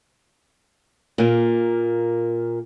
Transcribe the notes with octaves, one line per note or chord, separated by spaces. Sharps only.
A#2 A#3